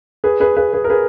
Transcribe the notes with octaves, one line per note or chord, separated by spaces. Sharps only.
G#4 B4
G#4 B4
G#4 B4
G#4 B4
A#4
G#4 B4